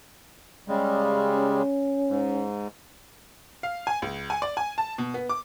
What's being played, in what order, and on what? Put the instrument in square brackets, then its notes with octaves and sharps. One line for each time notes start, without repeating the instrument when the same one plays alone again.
[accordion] C#3 G3 G#3
[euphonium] C#4
[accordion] G#2
[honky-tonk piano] F5
G#5
C#2
G#5
D5
G#5
A5
B2
B3
D6